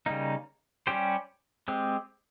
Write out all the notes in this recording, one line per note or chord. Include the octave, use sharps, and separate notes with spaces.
C#3 G3 A#3 D#4
G3 C#4 G4 C5
G#3 C4 G4